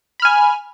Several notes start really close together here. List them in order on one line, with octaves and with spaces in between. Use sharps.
B5 F6 G#5